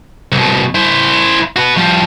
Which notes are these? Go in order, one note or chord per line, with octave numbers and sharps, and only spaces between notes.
C2 B2
E4 C5
F#4 B4
F3 G3